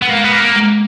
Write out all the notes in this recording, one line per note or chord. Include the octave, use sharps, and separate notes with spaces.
B3
G#3 A#3
B3
A#3
G#3